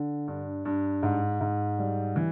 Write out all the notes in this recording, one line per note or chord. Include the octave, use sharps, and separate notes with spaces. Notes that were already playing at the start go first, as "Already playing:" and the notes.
Already playing: D3
G2
G2
G#2
G#2
G3
E3